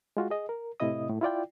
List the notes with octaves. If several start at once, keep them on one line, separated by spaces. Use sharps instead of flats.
G#3 F4 F#4
G#4 D#5
A#4
A2 C3 E4 D#5 D#6
A2
E4 F4 D5 G5